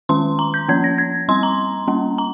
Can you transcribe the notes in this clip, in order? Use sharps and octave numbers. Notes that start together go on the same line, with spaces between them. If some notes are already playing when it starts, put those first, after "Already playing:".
D#3 G#3 C#4 C6
A#5
G6
F3 A#3 C#4 G#6
A#6
G#6
G3 C4 C6
A#5
G3 A#3 C#4
A#5